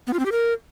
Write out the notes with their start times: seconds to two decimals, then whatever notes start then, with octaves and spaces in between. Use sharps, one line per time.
0.07 B3
0.13 F4
0.19 C4
0.26 G4
0.32 A#4